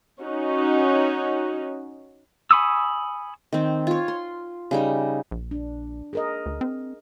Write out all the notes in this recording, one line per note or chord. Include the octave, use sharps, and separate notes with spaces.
C#4 D#4 F#4
G#5 B5 C#6 D#6 E6
D#3 C4
F4 C#5
C6
C#3 G3 D#4
A#1
D4
G#4 A#4 D#5
D2
C4